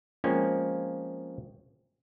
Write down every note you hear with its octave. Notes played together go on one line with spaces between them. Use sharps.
F3 G#3 A#3 C4 C#4